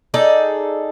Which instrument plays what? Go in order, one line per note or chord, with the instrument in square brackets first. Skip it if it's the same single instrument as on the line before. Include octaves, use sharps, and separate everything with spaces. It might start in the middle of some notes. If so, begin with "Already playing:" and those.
[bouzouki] D#4 G#4 A4 D5